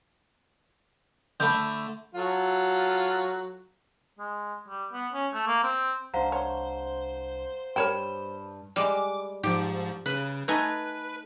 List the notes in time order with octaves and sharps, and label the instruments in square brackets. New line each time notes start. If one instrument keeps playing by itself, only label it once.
[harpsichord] D3 A3 [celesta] B5 G6
[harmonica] F#3 F4 A4
[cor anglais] G#3
G3
B3
C#4
A3
A#3
C4
[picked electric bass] C2 D4 [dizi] C5 [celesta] F5 F#5 A#5
[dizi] C5 [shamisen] C#5
[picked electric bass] G2 G3 [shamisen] A#4 C#5 G5 [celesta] B5 E7
[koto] G3 G#3 [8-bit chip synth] D6
[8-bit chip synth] G#2 F3 [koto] G4
[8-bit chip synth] C#3 [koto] B4
[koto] A3 D#4 G#5 [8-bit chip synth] B4